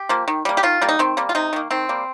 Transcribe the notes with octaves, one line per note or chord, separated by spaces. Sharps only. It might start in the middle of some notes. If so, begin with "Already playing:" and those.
Already playing: G4
F3 A#3
D#3
G3 A#3
G4
D#3 F4
G3 A#3
D#4
D#3 C4
G3 A#3
F4
C3 D#4
D#3 A#3
D#3 C4
G3 A#3